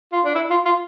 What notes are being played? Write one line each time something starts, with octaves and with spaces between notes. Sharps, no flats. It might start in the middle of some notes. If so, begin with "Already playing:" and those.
F4
D4
E4
F4
F4